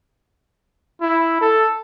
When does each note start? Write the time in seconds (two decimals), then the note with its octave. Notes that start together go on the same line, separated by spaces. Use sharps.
1.01 E4
1.41 A4